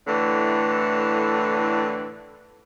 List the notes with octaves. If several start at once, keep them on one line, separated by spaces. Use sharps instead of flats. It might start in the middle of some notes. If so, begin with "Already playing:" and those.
A2 D3 E3